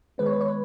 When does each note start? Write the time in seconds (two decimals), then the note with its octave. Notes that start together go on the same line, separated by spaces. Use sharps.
0.18 D#3 G#3 B3 B4
0.26 C#5
0.33 B4
0.41 C#5
0.48 B4